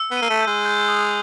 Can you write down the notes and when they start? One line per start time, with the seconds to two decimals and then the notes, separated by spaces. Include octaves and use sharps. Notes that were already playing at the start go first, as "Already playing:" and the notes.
Already playing: E6
0.11 B3
0.17 A#3 D#7
0.30 A3
0.40 G6
0.47 G#3
0.66 G6
0.89 D#6